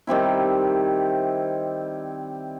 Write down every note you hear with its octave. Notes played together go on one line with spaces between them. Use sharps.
D#3 G3 C4 E4